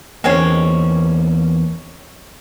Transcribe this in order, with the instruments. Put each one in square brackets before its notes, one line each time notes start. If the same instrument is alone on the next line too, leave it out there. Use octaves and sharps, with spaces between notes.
[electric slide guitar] E2 A#3 [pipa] G#3 C4 C#4